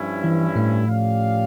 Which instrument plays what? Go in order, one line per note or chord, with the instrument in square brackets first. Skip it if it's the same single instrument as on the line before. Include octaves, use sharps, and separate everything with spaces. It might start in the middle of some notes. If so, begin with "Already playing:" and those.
Already playing: [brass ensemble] G2 F3 C#4 E4
[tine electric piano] E3
A2 A3
[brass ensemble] F3 C#4 G4 D5 F5